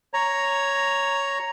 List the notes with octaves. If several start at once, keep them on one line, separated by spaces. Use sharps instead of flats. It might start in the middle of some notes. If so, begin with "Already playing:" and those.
C#5 A#5